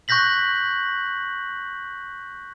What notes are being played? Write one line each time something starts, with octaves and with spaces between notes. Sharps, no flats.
C#6 F#6 G6 A#6 B6 F#7